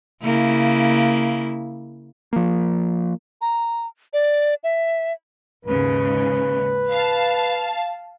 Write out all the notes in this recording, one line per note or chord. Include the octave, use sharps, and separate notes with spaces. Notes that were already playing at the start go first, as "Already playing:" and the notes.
C#3 A#3 E4
F3 A#3
A#5
D5
E5
D#2 G#2 C#3 B4
F5 A5